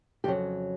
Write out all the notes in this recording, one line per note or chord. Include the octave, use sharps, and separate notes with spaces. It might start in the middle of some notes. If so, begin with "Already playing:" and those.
F2 C#3 F#3 G4